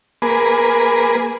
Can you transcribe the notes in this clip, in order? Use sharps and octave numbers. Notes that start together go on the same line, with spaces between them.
A#3 G#4 B4